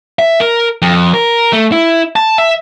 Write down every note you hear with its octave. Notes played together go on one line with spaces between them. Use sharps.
E5
A#4
F2
A#4
A3
E4
A5
E5